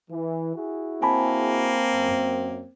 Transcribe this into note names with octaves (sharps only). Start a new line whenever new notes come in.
E3
E4 F#4 G#4
A#3 C4 G#5 A5 B5
F#2